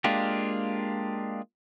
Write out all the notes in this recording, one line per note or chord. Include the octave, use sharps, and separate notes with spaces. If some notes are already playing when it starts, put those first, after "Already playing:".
G#3 A#3 D4 F4 G4